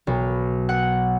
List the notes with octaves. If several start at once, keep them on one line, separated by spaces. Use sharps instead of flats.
B1
F#5